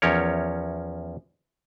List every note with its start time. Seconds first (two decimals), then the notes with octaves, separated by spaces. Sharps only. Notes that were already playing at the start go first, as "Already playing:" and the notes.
0.02 E2 F3 C#4 A#4 C#5